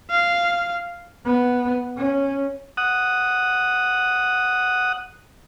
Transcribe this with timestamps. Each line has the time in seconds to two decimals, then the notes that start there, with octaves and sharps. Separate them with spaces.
0.10 F5
1.25 B3
1.97 C#4
2.77 F#5 D#6